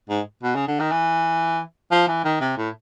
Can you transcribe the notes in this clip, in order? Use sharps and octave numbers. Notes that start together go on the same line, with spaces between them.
G#2
B2
C#3
D3
D#3
E3
F3
E3
D#3
C3
A2